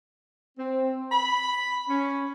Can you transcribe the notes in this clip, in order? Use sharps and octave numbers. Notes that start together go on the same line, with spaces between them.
C4
B5
C#4